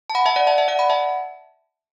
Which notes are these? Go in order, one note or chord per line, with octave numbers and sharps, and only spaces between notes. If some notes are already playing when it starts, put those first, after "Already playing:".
A5
F#5 B5
E5 A5
D5 F#5
E5 A5
E5 A5
D5 F#5
F#5 B5
E5 A5